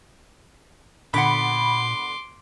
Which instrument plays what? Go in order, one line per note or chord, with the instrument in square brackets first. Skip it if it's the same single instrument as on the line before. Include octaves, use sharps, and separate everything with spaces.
[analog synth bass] A#2 [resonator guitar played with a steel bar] D3 B3 F#5 [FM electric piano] B5 [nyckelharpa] C6 D6